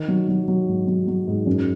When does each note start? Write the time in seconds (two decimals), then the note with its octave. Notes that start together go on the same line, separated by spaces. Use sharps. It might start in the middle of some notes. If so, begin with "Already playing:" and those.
Already playing: D#3
0.08 F#3
0.29 F#3
0.48 F#3
0.68 G#2
0.87 F#3
1.08 F#3
1.28 G#2
1.46 F#2